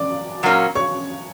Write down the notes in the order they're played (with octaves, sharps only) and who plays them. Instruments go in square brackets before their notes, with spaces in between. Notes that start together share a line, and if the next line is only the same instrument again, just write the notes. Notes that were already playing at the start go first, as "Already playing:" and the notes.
Already playing: [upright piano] D5 D6
[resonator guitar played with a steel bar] A#2 F#3 A#3 C#4
[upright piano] C#5 C#6